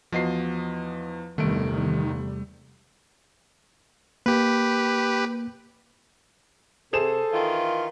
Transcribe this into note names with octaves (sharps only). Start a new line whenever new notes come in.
E2 F3 F#4 D#5 C7
G1 E2 C3 D#3 G3 A3 D7
A#3 G4 B4
C3 G#4 A4 C5 E7
D#3 E3 F4